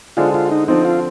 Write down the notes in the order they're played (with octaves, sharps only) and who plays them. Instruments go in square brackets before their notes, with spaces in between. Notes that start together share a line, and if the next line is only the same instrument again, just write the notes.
[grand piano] D3 G#3 D4 G#4 C5 [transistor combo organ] F4
[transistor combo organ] F4
D#4
[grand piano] D3 F3 C4 [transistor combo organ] D#4
[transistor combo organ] F4